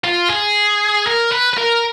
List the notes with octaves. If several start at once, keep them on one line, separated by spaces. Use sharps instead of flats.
F4
G#4
A#4
B4
B4
A#4